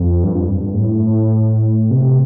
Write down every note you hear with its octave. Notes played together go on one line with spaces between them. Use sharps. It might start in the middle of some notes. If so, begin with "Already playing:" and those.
Already playing: F2
G2
F2
G2
G2
A2
C3